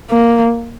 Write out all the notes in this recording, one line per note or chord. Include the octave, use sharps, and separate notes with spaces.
A#3